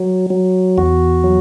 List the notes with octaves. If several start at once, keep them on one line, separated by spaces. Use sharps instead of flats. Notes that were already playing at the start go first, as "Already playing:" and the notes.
Already playing: F#3
F#3
E2 F#4
F#3